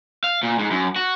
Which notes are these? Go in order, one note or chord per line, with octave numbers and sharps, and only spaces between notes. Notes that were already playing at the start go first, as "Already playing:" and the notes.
F5
A#2
G#2
F#2
F#4